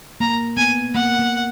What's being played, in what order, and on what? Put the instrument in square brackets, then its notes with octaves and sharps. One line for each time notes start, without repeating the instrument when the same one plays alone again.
[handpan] A#3 [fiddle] A#5
[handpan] B3 [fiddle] G#5
[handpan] A#3 [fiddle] F#5
[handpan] A#3